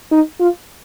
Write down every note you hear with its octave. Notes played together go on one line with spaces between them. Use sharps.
D#4
F4